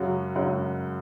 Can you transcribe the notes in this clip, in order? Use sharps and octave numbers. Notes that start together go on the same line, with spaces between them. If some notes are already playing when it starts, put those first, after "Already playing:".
Already playing: F#2 C#3 F#3
F#2 C#3 F#3